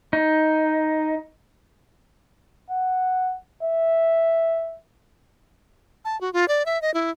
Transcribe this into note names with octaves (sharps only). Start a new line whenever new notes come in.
D#4
F#5
E5
A5
F#4
F4
D5
E5
D#5
E4